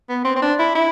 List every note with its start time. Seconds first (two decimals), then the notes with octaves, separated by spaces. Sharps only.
0.09 B3
0.25 C4
0.36 C4
0.42 D4
0.59 E4
0.75 E4